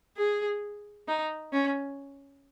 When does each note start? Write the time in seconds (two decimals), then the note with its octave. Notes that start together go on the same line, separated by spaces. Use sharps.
0.17 G#4
1.08 D#4
1.53 C#4